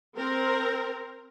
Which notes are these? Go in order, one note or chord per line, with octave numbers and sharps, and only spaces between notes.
C4 A#4